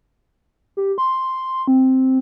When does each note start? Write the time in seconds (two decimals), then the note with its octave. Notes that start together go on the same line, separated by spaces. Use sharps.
0.77 G4
0.98 C6
1.68 C4